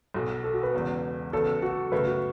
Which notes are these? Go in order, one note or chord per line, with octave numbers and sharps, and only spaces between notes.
B1 B2 F#3 A4
A4
F#4
B4
E1 E2 C#3 F#3 B3
E2 C#3 F#3 B3 A4
F#4
F#2 C#3 A3 B4
F#4